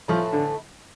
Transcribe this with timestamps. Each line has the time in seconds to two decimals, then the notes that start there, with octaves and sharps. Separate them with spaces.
0.08 A2 E3 F3 A3 E4
0.33 D3